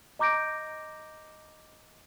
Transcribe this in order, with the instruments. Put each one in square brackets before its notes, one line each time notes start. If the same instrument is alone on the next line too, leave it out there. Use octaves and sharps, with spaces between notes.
[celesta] D#5 A#5 D6 G6 A#6 D7